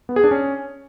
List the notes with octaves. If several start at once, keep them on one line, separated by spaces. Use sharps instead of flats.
B3
G#4
D4
C#4